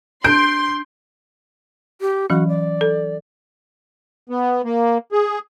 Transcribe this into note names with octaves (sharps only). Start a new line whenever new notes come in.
D4 C6 G6 D7
G4
E3 F#3 C#4 F#4
D5
A4
B3
A#3
G#4